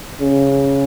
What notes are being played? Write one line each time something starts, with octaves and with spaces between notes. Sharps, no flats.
C#3